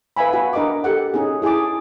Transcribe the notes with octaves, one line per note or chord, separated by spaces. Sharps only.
B4 E5 F5 G#5 B5
F#4 F5 F#5 G#5
D4 A#4 D#5 F#5 D6
G4 A4 F#5
C#4 D#4 G#4
E4 G#4 G#5 A5 D6